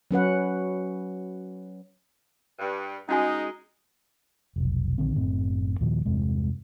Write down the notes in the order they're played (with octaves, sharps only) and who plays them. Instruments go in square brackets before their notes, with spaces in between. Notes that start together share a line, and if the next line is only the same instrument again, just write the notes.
[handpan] F#3 C#4 B4 F#5
[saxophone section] G2
[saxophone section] G#3 [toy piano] C#4 F#4 G#5 [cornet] D#4
[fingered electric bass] F1 B1
A#1 D3 D#3 C4
F#1 A2 C4
D#2 A#2 D#3 F3
E2 G2 C3 G#3